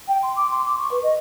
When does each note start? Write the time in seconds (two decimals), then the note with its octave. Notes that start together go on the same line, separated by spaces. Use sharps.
0.08 G5
0.23 C6
0.36 D6
0.51 C6
0.65 D6
0.78 C#6
0.91 B4
1.03 D#5